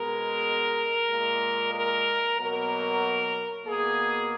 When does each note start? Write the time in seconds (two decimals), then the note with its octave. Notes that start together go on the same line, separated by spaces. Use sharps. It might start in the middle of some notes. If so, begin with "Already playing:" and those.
Already playing: B2 G#3 A#4
1.11 A#2 G#3
1.75 A#4
2.39 B2 F#3 A#3 A#4
3.66 B2 A#3 G#4